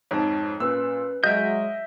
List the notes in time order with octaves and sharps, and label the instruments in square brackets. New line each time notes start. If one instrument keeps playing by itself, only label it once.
[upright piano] F2 G#2 [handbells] C#5 A5
[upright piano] A#2 E6 [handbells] C#4 B4 F#6
[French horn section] F#3 G#3 [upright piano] D#5 [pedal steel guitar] E5 G6 [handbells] F6 D7